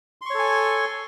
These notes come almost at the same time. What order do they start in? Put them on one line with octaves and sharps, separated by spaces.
C6 C#6 C#5 A4 G#5